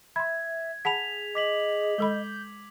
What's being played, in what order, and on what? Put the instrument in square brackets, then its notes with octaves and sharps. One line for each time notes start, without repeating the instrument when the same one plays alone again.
[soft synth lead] E5 [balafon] B5 C6 [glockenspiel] G#6
[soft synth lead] G#4 [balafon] F#5 A5 B5 [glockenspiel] B6 F7
[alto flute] D#5 [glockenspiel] D6 B6 F#7
[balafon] G#3 A4 B5 [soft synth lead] G6